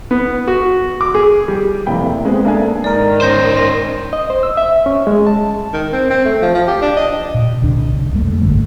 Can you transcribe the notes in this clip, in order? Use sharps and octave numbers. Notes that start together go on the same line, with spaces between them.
B3
F#4
D6
G#4
G3
F1 E3 A#3 G5 B5
E4
G#3 B3 C4 G#4
A#3 D4 A4 E5 F5 G#5
G#2 D#3 A#4 D5
C#4 C5 C6 G6 A#6
A#6
D#5
C5
E6
E5
C#4
G#3
A5
D#3
C4
C4
A3
F3
F3
G4
D4
D#5
A#2
E1 C2 D3 D4
F2 G3 A3 A#3
G#1 G2 D3 A3